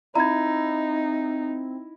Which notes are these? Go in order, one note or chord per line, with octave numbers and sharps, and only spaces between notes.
C4 D#4 E4 A#5 G#6